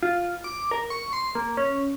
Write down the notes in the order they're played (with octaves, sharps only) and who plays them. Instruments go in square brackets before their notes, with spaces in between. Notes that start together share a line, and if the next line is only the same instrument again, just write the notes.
[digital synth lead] F4
D6
A#4
C#6
C6
A#3
C#4